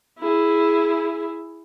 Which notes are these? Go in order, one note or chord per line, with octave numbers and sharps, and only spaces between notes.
E4 G#4